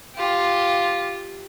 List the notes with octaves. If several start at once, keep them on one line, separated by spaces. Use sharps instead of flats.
F4 G4